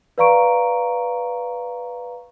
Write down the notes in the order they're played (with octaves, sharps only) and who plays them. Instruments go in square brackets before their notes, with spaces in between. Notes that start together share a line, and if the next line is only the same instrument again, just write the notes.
[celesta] B4 D5 F5 A#5 C#6 D7